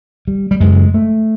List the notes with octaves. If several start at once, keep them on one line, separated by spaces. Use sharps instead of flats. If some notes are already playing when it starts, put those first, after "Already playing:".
G3
G3
F#2 C#3 G#3
A3